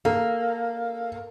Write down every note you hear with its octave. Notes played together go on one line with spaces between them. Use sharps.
A#3 A4